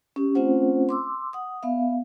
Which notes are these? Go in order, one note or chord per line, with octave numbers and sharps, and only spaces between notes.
C#4 G4
A3 C4 C#4 F4 C5 F#5
C6 D6 E6
F#5 D#6
B3 E5 F5